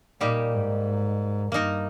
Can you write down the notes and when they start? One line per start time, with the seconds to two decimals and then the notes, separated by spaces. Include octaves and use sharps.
0.21 A#2 G3 A#3 D#4 G4
0.54 G#2
1.52 G2 A#3 D#4 A#4